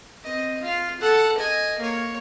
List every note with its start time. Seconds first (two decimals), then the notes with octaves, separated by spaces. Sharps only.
0.24 C4 D#5
0.62 F4 F5
1.00 A4 F#5
1.38 D#5 G#5
1.79 A#3 C#5